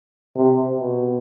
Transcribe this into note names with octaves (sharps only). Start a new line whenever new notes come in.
C3
B2